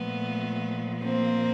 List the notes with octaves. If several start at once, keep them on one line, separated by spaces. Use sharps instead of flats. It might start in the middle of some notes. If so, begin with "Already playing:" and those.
Already playing: A#2 F3 A3 B3
A#3 C4